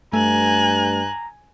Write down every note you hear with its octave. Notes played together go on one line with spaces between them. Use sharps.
G2 A3 G#5 A#5 F#6